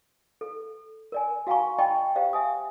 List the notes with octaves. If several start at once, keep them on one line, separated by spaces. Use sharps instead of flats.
A4
A#4 D5 G#5
F#4 F5 F#5 G#5 A#5 C#6
D5 D#5 G5 A5 B5 C#6
G4 C5 D5 F5
E5 G#5 D#6